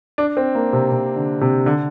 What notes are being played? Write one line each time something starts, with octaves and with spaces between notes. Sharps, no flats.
D4
C4
A#3
C3
C3
D3
C3
D3